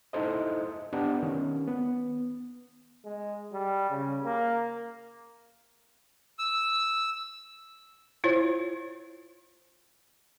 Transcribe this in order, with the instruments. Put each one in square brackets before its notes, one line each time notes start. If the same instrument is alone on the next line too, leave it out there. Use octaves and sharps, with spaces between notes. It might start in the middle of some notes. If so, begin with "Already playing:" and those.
[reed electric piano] D#4 E4 A4 C5 D#5
B3 D4 G4 F#5
D#3 C#4
B3
[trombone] G#3
G3
C#3
A#3
[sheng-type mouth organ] E6
[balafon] E4 F4 C5 C#5